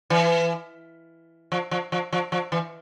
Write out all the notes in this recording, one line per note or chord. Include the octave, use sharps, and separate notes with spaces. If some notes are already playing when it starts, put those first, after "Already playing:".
E3
F3
F3
F3
F3
F3
E3